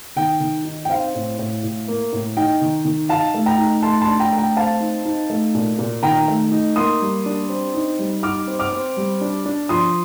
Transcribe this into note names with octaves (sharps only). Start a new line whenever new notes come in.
D#3 G5
D#3
D#4
G5
C4 F5
A2
A2
A2
A#3
A2
D#4 G5
D#3
D#3
D#4 F5 A5
A3
G5 A#5
D#4
A3 A5 C6
A5 C6
D4
G5 A#5
A3
G5 A#5
C4 F5 A5
D#4
D#4
A3
A#2
A#2
D#3 G5 A#5
A3
D#4
A#3 C6 D#6
G3
D4
C4
D#4
G3
D#4 D6 F6
C4
D6 F6
C4
G3
D4
D4
F3 C6 D#6